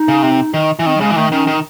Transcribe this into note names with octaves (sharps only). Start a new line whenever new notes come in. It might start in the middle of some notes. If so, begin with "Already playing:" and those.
Already playing: D#4
C#3
C3
D#3
E3
D#3 C4
F#3
C#3 G#3
E3
D#3 A3
D#3 C#4
D#3